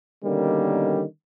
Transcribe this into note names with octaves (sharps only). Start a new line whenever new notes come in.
B2 D3 D#3 G3 A#3 C#4